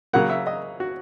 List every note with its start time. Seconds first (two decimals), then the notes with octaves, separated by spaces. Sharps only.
0.13 C#3 F#3 A#3 F#5
0.29 E5
0.47 D#5
0.80 F#4